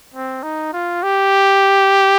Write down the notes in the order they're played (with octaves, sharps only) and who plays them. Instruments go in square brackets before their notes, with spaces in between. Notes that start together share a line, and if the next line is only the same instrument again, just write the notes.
[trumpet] C4
D#4
F4
G4